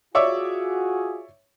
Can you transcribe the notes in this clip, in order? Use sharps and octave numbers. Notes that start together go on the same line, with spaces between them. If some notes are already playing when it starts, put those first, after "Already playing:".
F4 F#4 G#4 C#5 D5 E5